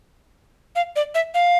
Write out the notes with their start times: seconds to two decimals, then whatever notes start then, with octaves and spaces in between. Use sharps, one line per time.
0.76 F5
0.96 D5
1.15 E5
1.34 F5